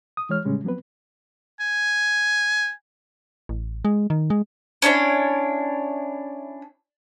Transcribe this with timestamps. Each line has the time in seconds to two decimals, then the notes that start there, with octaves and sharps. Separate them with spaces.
0.17 D#6
0.29 E3 G#3 C#5 F6
0.44 A2 C#3 G3 G#3 C#4
0.64 F3 F#3 B3 C4 B4
1.60 G#5
3.49 A1
3.85 G#3
4.10 D#3
4.30 G#3
4.82 C#4 D4 E4 C#5